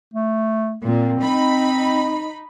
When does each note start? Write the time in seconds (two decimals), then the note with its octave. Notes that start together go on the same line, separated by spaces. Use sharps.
0.14 A3
0.85 A#2 C4
1.22 D#4 B5